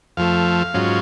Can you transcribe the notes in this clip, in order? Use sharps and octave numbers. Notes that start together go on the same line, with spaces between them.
F2 F3 A3 F5
G#2 F#3 C#4 F4